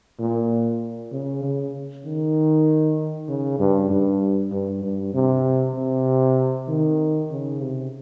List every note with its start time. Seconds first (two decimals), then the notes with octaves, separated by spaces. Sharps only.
0.19 A#2
1.12 C#3
1.43 C#3
2.05 D#3
3.28 C#3
3.59 G2
3.90 G2
4.52 G2
4.83 G2
5.14 C3
5.75 C3
6.68 D#3
7.31 C#3
7.62 C3